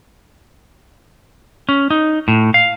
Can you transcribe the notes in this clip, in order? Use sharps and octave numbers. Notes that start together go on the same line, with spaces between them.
C#4
D#4
A2
F5